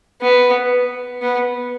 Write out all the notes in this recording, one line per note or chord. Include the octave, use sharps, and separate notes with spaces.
B3
B3